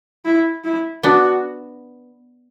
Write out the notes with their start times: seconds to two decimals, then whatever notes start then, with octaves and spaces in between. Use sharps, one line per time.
0.25 E4
0.64 E4
1.03 B3 D4 F#4